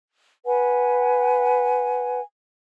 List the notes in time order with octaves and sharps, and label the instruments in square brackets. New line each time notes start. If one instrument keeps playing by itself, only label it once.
[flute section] B4 F#5 G#5